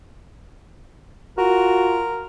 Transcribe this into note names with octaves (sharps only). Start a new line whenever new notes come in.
F4 F#4 A#4